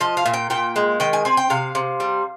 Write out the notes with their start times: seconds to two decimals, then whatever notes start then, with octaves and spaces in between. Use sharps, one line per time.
0.01 F3 D#5
0.17 F5
0.26 A#2
0.34 G5
0.50 A#2 G5
0.76 G#3
1.00 D#3 G5
1.13 G#5
1.25 C4 G#5
1.37 G5
1.50 C3 F5
1.75 C3
2.00 G3